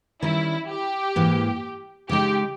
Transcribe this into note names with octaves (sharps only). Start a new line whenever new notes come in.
D#3 G3 C#4 E4
G4
G#2 E3 A#3
C#3 G#3 D#4 G4